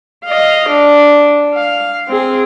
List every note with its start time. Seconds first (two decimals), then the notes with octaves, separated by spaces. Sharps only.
0.25 D#5 F5
0.69 D4
1.54 F5
2.09 C4 G#4